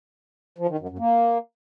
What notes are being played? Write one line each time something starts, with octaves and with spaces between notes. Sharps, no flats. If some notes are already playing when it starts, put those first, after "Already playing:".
F3
D#3
F#2
F#2
A#3